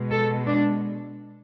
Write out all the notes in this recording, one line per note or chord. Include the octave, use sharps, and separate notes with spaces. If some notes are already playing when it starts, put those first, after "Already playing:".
Already playing: B2 G#3
A4
D4